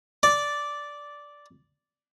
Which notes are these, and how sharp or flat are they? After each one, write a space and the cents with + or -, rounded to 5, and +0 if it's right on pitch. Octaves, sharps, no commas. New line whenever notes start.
D5 -5